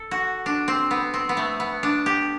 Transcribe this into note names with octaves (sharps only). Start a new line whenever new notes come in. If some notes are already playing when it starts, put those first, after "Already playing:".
Already playing: A4
F#4
D4
C4
B3
C4
B3
A3
B3
D4
G4